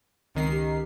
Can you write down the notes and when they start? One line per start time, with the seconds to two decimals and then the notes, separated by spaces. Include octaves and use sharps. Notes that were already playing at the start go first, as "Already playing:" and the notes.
0.35 C#2 D#3 C4 C7
0.51 G4